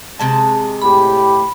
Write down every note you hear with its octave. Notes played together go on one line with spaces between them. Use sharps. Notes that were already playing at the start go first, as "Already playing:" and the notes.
C3 G#3 A5
A2 G4 B5